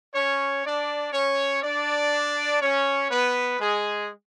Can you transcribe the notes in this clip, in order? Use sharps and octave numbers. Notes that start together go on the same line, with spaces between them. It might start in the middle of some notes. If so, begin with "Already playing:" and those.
C#4 C#5
D4 D5
C#4 C#5
D4 D5
C#4 C#5
B3 B4
G#3 G#4